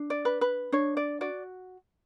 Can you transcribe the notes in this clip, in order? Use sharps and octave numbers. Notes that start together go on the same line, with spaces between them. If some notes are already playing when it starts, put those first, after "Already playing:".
Already playing: D4
D5
B4
B4
D4 C#5
D5
F#4 D5